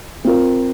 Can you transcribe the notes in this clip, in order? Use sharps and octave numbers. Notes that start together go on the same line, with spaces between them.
C4 F4 A#4